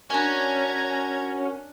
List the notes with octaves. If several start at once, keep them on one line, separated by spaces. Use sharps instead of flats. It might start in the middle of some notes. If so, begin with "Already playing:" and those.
C#4 D4 F#4 A#4 F#5 G#5 A#5 G#6